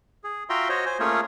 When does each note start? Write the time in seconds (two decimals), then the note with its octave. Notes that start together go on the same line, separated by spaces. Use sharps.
0.24 G#4
0.50 F4 F#4 E5 G5 A#5 C6
0.69 F#4 C5 C#5 D#5
0.86 C5 G#5
1.00 A3 A#3 C#4 F4 G#4 C#5